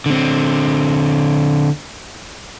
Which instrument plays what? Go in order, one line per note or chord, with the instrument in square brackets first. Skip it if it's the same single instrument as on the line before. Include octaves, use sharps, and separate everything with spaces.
[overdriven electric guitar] D3 C4